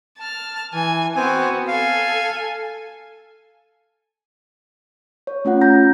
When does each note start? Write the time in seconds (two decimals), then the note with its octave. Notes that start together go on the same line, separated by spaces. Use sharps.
0.18 A5 F6
0.74 E3 G#5
1.16 B3 C4 F#4 G#5
1.68 A4 F5 G#5
5.27 C#5
5.45 A3 C#4 F4 F#5
5.61 A#5 G6 A#6